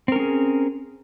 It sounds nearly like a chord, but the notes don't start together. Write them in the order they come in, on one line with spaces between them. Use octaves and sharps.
C4 A#4 C#4 G#4